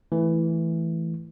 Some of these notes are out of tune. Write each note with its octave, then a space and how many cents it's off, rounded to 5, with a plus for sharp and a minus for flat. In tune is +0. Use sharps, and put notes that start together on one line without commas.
E3 +0 A3 +0